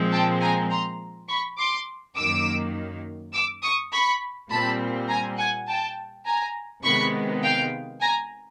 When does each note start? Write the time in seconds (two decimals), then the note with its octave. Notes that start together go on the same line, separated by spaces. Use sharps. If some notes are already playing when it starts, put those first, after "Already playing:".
Already playing: A#2 F3 G#3 C4
0.12 G5 A5
0.40 G#5 A#5
0.70 A#5 C6
1.29 B5 C#6
1.58 C6 D6
2.16 F#2 D#3 F#3 A#3 D6 E6
3.33 D6 E6
3.63 C#6 D#6
3.92 B5 C#6
4.50 A#2 G3 C4 A5 B5
5.08 G#5 A#5
5.38 F#5 G#5
5.67 G5 A5
6.25 G#5 A#5
6.83 C3 D#3 G#3 B3 B5 C#6
7.43 F5 G5
8.00 G#5 A#5